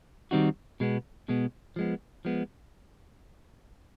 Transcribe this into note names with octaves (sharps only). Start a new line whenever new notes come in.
D#3 G3 C4 D#4 F#4
B2 G#3 B3
B2 G#3 B3
F3 G#3 B3
F3 G#3 B3